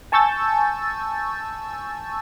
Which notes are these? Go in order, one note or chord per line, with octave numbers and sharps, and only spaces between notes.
G#5 A5 C#6 E6 G6 A6